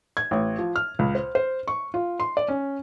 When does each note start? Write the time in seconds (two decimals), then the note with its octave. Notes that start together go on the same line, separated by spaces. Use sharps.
0.17 G#6
0.31 A1
0.58 F3
0.76 F6
0.99 C#2
1.15 C5
1.35 C5
1.68 C#6
1.94 F4
2.20 C6
2.37 D5
2.48 C#4